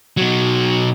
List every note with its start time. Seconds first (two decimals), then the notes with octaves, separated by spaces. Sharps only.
0.17 B2 F#3